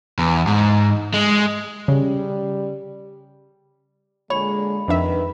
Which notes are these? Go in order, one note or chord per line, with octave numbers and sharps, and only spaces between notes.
E2
G#2
G#3
C#3 G3
A#2 D3 G#3 C#5 B5
F2 D#3 D4 B4 E5